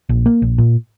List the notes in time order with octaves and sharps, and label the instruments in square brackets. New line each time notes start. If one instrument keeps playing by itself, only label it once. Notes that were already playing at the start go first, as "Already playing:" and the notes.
[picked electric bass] A#1
A#3
A#1
A#2